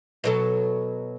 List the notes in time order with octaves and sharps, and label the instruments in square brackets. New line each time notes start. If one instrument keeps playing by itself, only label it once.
[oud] B2 F#3 A4